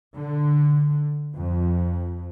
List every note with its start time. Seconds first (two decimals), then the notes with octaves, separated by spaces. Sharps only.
0.15 D3
1.35 F2